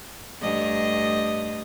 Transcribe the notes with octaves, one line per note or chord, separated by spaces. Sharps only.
G2 A3 D#5